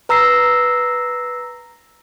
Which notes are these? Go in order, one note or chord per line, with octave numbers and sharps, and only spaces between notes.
B4 A#5 E6 A#6 C7